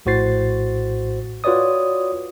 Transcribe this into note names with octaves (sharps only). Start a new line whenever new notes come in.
A#1 A2 F#4 C5 A6 C7
F4 F#4 B4 C#5 D5 D#6